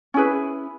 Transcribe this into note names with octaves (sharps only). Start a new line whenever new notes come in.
C#4 E4 G#4 B4